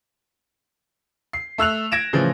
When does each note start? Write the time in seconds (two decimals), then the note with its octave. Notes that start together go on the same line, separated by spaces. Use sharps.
1.33 C7
1.58 A3 E6 F#6 F7
1.92 G#6 A#6 D7 E7
2.13 A2 C#3 E3 F3